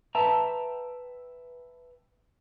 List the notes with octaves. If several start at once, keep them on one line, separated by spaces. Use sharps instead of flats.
B4 E5 G5 A5 A#5